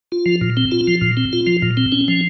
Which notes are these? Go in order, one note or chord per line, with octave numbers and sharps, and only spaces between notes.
F4
F3
A#2
C4
F4
F3
A#2
C4
F4
F3
A#2
C4
C#4
F3